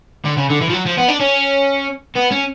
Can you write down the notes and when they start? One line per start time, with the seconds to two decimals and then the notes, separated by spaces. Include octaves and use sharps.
0.25 D3
0.37 C#3
0.50 D3
0.61 E3
0.69 F3
0.73 F#3
0.86 F3
0.97 B3
1.08 D4
1.20 C#4
2.16 B3
2.32 C#4